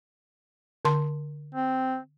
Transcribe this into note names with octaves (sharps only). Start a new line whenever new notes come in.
D3 A5 C6
C4